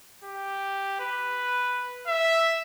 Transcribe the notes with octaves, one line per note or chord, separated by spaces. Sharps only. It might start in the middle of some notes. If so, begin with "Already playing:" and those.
G4
B4
E5